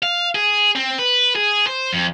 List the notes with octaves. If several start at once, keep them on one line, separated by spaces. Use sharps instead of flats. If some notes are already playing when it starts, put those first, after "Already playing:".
F5
G#4
C4
B4
G#4
C5
F2